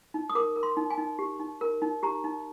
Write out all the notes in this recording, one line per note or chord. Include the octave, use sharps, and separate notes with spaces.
D#4
D#6
A#4 D6
A#4
C6
D#4
G#5
D#4
G4
D#4
A#4
D#4
G4 A#5
D#4